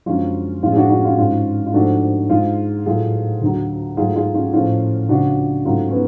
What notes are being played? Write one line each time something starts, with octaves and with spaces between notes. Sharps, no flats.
F#2 D3 F3 G#3 C#4 F4
A2 F3 G#3 C#4 F4
G#4
D4 F#4
D4 F#4
C#4 F4
G#2 G#3 C#4 F4
F4
G#2 F3 A3 D4 F#4
G#2 G#3 F4 G#4
A2 F#3 A3 F4 G#4
D2 D3 F#3
G#2 F#3 A3 F4 G#4
F4 G#4
C#4 F4
A2 F3 A3 C#4 F4
C#2 C#3 F3 D4 F#4
G#2 F#3 A3 C#4 F4
C#4
B3